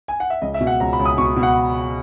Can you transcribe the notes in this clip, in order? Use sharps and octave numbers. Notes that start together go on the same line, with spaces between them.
G#5
F#5
E5
C#2 D#5
E5
B2
F#5
C#2 A#5
B5
C#2
D#6
B2 C#6
B2
F#5